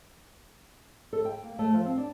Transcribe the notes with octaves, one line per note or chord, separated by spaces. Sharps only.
A4
G5
A#3
A3
F3
C4
D4